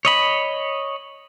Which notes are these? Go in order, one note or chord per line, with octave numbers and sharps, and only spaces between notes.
C#5 D#5 B5